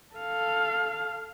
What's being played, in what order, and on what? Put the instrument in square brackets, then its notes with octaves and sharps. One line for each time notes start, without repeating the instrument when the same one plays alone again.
[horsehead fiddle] A4 F5